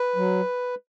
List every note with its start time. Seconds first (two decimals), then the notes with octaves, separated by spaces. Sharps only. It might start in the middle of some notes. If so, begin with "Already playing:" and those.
Already playing: B4
0.16 F#3